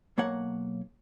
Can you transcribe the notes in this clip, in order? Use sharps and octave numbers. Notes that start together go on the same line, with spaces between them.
B1 A#3 C#5 F#5